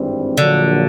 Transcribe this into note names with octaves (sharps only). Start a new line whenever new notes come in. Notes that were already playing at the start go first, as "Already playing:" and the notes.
Already playing: G#1 G2 E3 G3 C4
A#1 A#2 D3 F#3